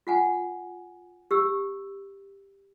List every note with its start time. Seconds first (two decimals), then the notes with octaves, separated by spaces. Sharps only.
0.07 F4 F#5 G#5
1.31 G4 E6